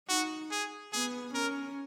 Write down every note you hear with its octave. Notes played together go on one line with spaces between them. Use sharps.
D#4 F#4
G#4
B3 G#4
C#4 A#4